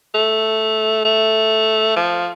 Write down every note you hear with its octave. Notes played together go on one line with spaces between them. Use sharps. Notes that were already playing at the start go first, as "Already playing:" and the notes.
A3
A3
F3